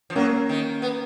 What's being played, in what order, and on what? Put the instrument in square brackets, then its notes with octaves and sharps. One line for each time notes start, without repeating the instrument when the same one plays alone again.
[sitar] F3
[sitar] F#3 [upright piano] A#3 C#4
[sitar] D#3
B3